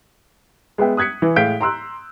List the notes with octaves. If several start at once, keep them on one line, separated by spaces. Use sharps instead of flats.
G#3 B3 E5 G5
D#6 F#6 G#6 B6 C#7
E3
A2 G#3 F5 G6 B6 D7
A#5 C6 E6 F#6